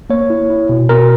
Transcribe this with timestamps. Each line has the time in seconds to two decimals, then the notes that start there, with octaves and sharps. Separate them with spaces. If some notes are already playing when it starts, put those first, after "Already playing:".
0.10 A#3 C#5
0.30 E4
0.50 E4
0.69 B2
0.89 B2 A#4